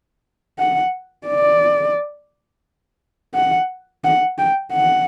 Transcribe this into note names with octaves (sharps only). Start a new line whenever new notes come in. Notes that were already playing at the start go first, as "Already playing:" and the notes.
F#5
D5
F#5
F#5
G5
F#5